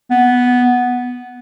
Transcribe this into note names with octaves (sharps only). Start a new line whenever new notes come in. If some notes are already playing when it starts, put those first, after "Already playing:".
B3